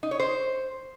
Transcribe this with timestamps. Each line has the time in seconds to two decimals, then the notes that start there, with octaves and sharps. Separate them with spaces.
0.03 D#4
0.11 C#5
0.20 C5